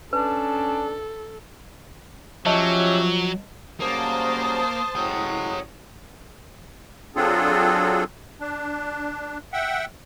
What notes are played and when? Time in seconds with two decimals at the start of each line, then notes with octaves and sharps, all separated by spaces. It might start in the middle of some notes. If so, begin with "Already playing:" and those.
0.13 C#4 D4 A4 B4
2.46 F3 F#3 C#4 G4 C#5 D#5 E5 A5
3.80 C#3 F#3 G3 A#3 C5 A5 D#6
4.96 A1 F#3 G#3 C#5 G5
7.16 F#3 C4 D4 F4 G#4 A4
8.41 D4
9.53 E5 F#5 G5